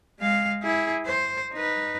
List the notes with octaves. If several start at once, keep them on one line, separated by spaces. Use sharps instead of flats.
G#3 F5
E4 G#4
C5
D#4 B4